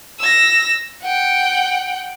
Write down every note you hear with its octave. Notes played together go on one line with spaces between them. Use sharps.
E6 A#6
F#5 G5